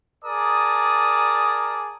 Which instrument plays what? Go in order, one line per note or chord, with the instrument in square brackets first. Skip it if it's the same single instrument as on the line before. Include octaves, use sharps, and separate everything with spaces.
[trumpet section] G#4 A#4 D5 A5 D#6